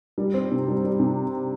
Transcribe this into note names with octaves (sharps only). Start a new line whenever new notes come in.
G3
C4
C3
G3
G3
C3